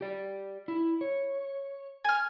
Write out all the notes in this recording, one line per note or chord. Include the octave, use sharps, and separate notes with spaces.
G4 D5
E4
C#5
G#5 F6